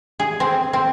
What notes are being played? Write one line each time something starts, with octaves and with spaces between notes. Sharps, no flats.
G#4
C4
C4